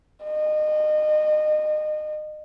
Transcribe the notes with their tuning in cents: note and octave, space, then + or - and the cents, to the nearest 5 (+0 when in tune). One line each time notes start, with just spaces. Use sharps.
D#5 -30